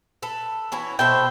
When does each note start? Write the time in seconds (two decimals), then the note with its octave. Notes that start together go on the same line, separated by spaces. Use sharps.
0.22 A4 B4
0.72 E3 C#4 F#4
0.99 B2 A4 C5 E5 G5